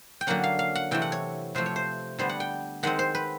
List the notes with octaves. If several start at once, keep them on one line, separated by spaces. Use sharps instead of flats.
G5
D3 F#3 A#3 C#4 F#5
F5
F5
F#5
C3 E3 A3 G5
F#5
C#5
C3 F3 A3 C5
C#5
C5
D3 G3 B3 C5
F#5
G5
D#3 G#3 C4 F#5
C5
B4